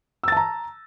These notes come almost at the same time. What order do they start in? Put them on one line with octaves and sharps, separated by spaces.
E6 A6 A5 A#5